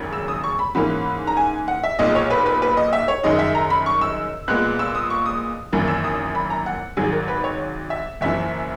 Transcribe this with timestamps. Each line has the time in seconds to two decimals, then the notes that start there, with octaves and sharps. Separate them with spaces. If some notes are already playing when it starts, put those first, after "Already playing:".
Already playing: G#1 F#2 C#3 F#3 A#3
0.13 E6
0.28 D#6
0.44 C#6
0.59 B5
0.75 G#2 E3 A#3 C#4 B5
1.27 A#5
1.37 G#5
1.68 F#5
1.83 E5
1.99 B1 A#2 G#3 D#5
2.15 C#5
2.30 B4
2.46 B4
2.62 B4
2.77 D#5
2.93 E5
3.08 C#5
3.23 F#2 D#3 G#3 D#4 D#5
3.39 E5
3.55 A#5
3.70 B5
3.86 C#6
4.01 E6
4.48 A#2 G#3 B3 F#6
4.79 E6
4.95 D#6
5.10 C#6
5.26 D#6
5.72 G#1 F#2 E3 A#3
5.88 E6
6.04 D#6
6.35 B5
6.50 A#5
6.66 F#5
6.97 G#1 G#2 F#3 G#4
7.12 A#4
7.28 B4
7.44 C#5
7.90 E5
8.21 F#1 F#2 E3 E5